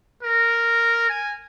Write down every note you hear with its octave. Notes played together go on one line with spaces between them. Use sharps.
A#4
G#5